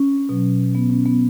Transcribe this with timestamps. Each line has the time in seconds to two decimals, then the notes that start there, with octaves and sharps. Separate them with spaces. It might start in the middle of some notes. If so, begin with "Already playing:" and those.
Already playing: C#4
0.29 B2 F#3
0.75 B3
0.90 C#4
1.06 B3